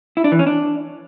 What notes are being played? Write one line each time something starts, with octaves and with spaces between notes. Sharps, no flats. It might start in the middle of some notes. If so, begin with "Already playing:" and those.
E4
D4
E3
C#4
D4